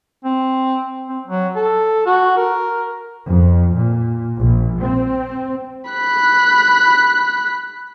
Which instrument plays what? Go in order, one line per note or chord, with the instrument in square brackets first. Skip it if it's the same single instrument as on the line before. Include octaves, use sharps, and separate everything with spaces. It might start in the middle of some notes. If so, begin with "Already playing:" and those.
[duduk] C4
C4
F#3
A4
F#4
A#4
[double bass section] F2
A#2
A#1
C4
[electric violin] B5 F#6